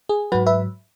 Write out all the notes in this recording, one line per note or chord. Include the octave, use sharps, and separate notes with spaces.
G#4
G#2 F#3 F#4 B4
B4 E5